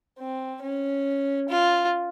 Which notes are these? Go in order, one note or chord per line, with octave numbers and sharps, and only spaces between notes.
C4
C#4
F4